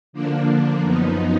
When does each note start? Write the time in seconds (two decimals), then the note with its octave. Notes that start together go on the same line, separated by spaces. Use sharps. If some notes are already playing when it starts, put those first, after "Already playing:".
0.13 D3 F3 A#3 D4
0.82 F#2 F3 B3 D#4